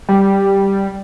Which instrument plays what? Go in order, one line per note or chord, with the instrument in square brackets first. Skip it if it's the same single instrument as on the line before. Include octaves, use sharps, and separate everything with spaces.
[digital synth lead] G3